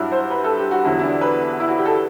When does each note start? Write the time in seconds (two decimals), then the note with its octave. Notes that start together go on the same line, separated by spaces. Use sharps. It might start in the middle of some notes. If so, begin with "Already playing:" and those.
Already playing: G2 F#3 E4 F#4
0.12 C5
0.30 B4
0.44 A4
0.58 G4
0.71 F#4
0.84 E2 D3 F#3 E4
0.99 E4
1.03 D4
1.21 B4
1.60 E4
1.68 F#4
1.78 G4
1.86 A4